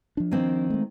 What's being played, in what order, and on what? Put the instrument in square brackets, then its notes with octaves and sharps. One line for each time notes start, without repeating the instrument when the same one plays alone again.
[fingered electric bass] F3 D4
[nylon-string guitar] D#3 A#3 C4
[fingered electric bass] G#3 A3